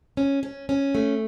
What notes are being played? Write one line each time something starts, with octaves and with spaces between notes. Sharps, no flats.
C#4
C#4
C#4
A3